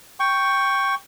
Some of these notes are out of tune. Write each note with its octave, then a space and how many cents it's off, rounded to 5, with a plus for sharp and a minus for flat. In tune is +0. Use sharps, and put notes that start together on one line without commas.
G5 +0 C#6 +0